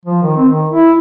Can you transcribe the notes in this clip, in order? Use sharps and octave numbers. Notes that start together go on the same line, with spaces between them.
F3
D#3
C4
D#3
E4